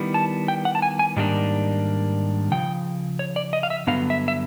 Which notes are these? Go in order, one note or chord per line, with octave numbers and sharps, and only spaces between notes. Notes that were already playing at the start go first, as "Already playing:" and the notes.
Already playing: D#3 G3 B3 E4
A5
G5
F#5
A5
G#5
G#5
G#2 D#3 G3 A#3 D4
C#3 F3 G5
C#5
D5
D#5
F5
E5
G2 D3 F#3 B3 F5
E5
E5